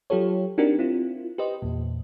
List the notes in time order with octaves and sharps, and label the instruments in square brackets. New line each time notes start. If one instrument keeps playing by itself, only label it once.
[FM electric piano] F#3 F4 G4 A4 C#5
C4 D4 D#4 F#4 G4 A#4
C4 E4 F4
G4 B4 C5 D#5
E2 A#2